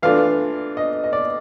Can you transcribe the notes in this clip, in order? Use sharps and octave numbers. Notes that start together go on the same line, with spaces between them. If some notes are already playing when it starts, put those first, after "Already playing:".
E3 A3 D4 F4 F5
D#5
D#5
D5